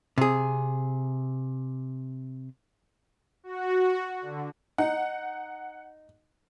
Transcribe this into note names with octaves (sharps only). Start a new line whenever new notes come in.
C3 G#4
F#4
D3
D#4 F#5